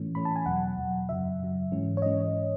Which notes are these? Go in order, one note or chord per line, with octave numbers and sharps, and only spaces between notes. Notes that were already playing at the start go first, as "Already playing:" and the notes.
Already playing: A2 E3 A3 C#4
A2 E3 A3 C#4 B5
A5
G#5
E2 B2 F#3 F#5
E2 B2 F#3
F#2 C#3 F#3 E5
F#2 C#3 F#3
G#2 E3 G#3 C#4
C#5
E3 G#3 C#4 D#5